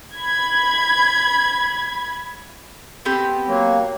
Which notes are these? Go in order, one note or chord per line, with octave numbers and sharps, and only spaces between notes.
B5 G#6
B3 C4 G4
F#3 A#3